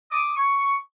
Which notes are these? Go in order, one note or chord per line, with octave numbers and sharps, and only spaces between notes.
D6 D#6
C#6